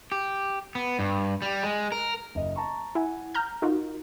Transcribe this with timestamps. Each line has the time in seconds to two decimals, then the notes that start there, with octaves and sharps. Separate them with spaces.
0.12 G4
0.75 B3
0.99 G2
1.42 G3
1.63 G#3
1.92 A#4
2.35 F#1 D#5
2.56 A5 A#5 C#6
2.95 E4 F#5 G#5
3.35 A#5 F6 G6
3.62 D#4 F4 F#4 A#4